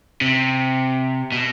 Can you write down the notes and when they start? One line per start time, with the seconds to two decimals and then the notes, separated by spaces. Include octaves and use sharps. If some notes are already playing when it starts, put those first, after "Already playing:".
0.21 C3
1.32 B2